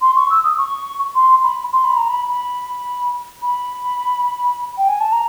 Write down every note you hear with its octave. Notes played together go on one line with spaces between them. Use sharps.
C6
C#6
E6
D#6
C#6
C6
B5
C6
B5
A#5
B5
B5
B5
G5
G#5
A5
A#5